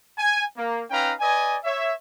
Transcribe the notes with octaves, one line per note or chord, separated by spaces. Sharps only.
G#5
A#3
C#4 D#4 B4 F5 G5 A#5
B4 D5 D#5 G#5
C#5 E5